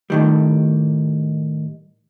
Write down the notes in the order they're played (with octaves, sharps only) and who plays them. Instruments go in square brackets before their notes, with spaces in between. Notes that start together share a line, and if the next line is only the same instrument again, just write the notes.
[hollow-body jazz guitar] A2 D#3 G3